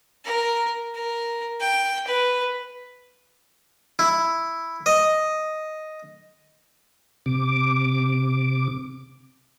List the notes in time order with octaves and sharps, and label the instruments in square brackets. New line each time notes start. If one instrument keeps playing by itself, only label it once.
[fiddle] A#4
A#4
G5
B4
[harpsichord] E4
D#5
[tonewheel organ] C3 D6